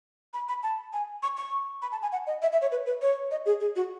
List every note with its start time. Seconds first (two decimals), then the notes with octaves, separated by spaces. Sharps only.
0.34 B5
0.49 B5
0.63 A5
0.93 G#5
1.23 C#6
1.37 C#6
1.82 B5
1.92 A5
2.02 G#5
2.12 F#5
2.27 D#5
2.42 E5
2.52 E5
2.62 C#5
2.72 B4
2.86 B4
3.02 C#5
3.31 D#5
3.46 G#4
3.60 G#4
3.76 F#4